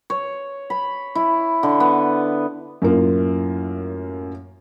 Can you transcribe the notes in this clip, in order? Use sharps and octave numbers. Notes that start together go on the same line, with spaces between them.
C#5
B5
E4
D3
B3
F#2 A2 A#3 F4